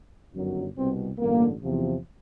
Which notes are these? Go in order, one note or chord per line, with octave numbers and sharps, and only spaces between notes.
G1 F#2 D#3 F#3
C2 B2 G3 C4
A1 G2 D3 G3 A#3
E2 C3 F3